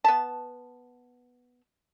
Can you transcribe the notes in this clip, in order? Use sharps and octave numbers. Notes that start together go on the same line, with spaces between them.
B3 A5